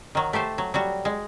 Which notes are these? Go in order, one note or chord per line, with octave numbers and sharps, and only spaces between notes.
D#3 F#3
A3 G4 A4 C5
F#3
F#3 G3 F#4
G#3